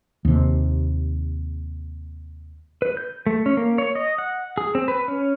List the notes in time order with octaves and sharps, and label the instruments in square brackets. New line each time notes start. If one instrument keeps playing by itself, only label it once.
[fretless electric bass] D#2 C3
[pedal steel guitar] B4
G6
A3
C#4
A#3
C#5
D#5
F#5
G#4
C4
B4
C#4